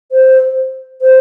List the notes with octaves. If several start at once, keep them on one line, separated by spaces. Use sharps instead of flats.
C5
C5